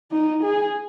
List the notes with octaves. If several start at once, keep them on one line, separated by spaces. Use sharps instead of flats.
D#4
G#4